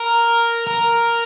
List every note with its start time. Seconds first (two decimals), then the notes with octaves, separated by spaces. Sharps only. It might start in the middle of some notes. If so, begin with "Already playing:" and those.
Already playing: A#4
0.67 A#4